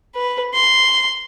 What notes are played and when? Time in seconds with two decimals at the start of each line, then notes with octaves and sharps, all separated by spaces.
0.15 B4
0.54 C6